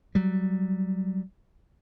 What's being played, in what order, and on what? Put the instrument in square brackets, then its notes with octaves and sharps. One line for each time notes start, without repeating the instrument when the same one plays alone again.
[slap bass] F#3 G3